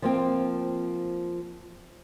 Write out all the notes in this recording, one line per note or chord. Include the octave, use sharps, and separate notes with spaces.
F3 A#3 C4